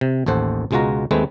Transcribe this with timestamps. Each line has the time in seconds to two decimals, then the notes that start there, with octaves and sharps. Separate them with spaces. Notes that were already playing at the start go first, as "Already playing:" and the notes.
0.01 C3
0.26 A1 D#2 A4 C5 F#5
0.71 C#2 B2 G#3 F4 F#4 A#5
1.11 D#2 G#3 A3 C4 B4